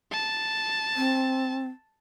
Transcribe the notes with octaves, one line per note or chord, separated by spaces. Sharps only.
A5
C4